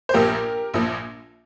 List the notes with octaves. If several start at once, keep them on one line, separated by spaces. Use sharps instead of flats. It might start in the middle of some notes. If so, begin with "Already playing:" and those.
C5
A#1 A#2 F3 G4 A#4
A#1 A#2 F3